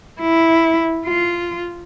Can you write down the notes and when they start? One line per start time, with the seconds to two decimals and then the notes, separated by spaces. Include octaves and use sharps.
0.21 E4
1.06 F4